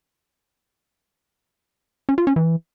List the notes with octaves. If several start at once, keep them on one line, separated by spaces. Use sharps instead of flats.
C#4
F4
C#4
E3